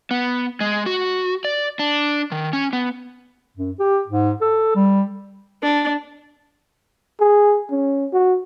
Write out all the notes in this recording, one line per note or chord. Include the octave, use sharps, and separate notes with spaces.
B3
G#3
F#4
D5
D4
D#3
C#4
B3
F#2
G4
G#2
A4
G3
D4
G#4
C#4
F#4